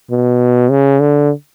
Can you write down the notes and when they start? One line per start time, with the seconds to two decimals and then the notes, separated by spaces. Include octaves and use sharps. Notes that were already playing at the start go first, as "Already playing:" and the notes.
0.11 B2
0.71 C#3
1.00 D3